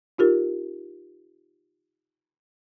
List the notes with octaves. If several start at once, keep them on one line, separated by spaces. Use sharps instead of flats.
D#4 F4 G4 A#4